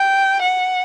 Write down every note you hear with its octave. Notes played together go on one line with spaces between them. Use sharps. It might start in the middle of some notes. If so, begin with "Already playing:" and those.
Already playing: G5
F#5